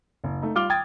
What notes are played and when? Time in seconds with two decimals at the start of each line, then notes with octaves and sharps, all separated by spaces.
0.24 F#1
0.42 A3 D#4
0.55 G3 F4 D6 F6 G7
0.70 G5 D#6 G#6 A6